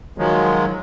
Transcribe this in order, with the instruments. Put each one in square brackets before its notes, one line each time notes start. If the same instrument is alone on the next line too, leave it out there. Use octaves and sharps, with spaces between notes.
[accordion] D#3 F3 F#3 G#3